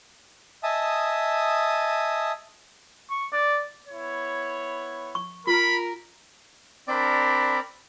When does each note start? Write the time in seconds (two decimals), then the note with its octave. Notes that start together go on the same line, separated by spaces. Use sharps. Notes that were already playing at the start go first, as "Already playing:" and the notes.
0.63 D#5 E5 G#5 A5 D#6
3.10 C#6
3.32 D5
3.88 B3 E4 C#5
5.15 C#6
5.47 F4 A#4 B5
6.88 C4 D4 A#4 D5 B5